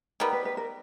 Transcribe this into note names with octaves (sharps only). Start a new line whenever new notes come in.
D#3 G3 B3 A#4
B4
B4
A#4